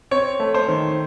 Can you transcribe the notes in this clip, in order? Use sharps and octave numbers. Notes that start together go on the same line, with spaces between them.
C4 C#5
A3
C5
D#3